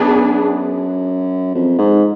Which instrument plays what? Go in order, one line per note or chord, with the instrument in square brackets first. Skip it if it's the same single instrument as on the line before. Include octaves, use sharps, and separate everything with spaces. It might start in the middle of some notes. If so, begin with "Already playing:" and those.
Already playing: [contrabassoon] F#2 [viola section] B3 D4 G#4
[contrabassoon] F2
G#2